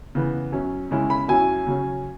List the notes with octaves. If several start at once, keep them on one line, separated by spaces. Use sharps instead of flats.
C#3 E3 B3
F#2 F#3 C#4
C#3 G#3 C#4 E4
B5
F#2 F#3 C#4 E4 G#5
C#3 F#3 C#4